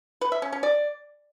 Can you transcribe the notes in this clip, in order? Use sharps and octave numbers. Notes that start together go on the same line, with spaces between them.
B4
E5
C#4
C#4
D5